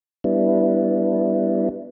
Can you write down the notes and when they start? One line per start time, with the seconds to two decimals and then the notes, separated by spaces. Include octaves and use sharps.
0.24 G3 B3 D4 E4